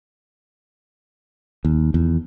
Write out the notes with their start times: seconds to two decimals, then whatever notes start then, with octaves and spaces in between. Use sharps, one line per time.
1.65 D#2
1.94 E2